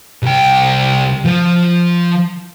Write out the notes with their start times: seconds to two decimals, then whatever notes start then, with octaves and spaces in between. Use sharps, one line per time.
0.23 C2 G5
1.25 F3